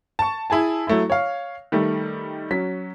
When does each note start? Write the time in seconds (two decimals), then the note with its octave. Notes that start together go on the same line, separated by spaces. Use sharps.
0.19 A5 C#6
0.50 E4 G#4 G#5 A5
0.87 F#3 A3 E4
1.10 C#5 F5
1.72 D#3 G3 A3
2.51 F#3 C#4 B6